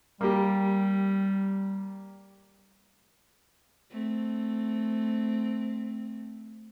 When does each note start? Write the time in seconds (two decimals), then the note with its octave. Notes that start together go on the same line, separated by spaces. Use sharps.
0.21 G3 A#3 G4
3.90 A3 C4